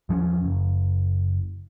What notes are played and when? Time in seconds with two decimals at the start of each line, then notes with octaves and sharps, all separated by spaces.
0.09 E2 F3 F#3 C#4
0.44 F#1